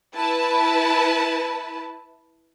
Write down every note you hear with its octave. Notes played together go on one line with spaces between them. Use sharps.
E4 B4 A5